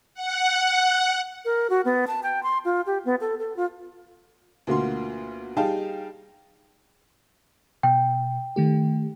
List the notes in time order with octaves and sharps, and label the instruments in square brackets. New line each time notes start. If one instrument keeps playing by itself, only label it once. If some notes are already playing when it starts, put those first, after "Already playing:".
[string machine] F#5
[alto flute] A#4
F#4
B3
A5
G5
C6
F4
G4
B3
A4
A4
F4
[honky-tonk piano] D2 B2 A#3 F4 F#4 C6
G3 D#4 G#4 F5 G5 A5
[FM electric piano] B2 [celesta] G5
[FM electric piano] D#3 A3 G4